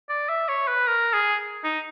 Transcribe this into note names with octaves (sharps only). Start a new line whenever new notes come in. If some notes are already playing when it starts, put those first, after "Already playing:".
D5
E5
C#5
B4
A#4
G#4
D#4